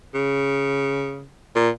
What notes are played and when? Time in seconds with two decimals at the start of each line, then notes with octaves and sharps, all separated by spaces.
0.14 C#3
1.55 A#2